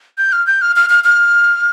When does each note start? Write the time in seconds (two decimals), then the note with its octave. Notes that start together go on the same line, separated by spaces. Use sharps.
0.18 G6
0.32 F6
0.47 G6
0.62 F6
0.76 F6
0.90 F6
1.04 F6